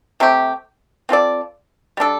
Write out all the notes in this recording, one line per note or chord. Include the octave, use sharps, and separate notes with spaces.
C3 A3 C4 G4
C4 F4 A4 D5
G3 D4 A4